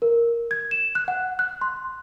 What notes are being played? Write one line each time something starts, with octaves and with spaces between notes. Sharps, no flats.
A#4
G#6
E7
F#6
F#5
F#6
C6